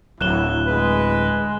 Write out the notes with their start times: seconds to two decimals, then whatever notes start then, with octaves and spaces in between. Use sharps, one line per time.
0.21 D1 F#3 E4 F#6 E7 G7
0.67 G#3 B4